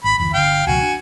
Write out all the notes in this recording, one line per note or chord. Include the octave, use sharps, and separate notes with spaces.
G#1 B5
F#1 D2 E3 B5
G1 D3 F5 G5
C#2 B2 F3 F#4 G#5
D4